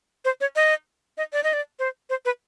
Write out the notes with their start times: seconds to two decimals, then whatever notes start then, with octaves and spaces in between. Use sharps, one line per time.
0.25 C5
0.41 C#5
0.56 D#5
1.18 D#5
1.33 D5
1.43 D#5
1.53 D5
1.79 C5
2.10 C5
2.25 B4